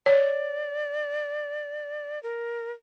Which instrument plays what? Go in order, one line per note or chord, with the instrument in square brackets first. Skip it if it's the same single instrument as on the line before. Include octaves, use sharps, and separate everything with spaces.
[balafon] C#5 [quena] D5
[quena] A#4